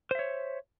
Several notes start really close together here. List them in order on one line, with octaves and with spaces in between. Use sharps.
C5 E5 C#5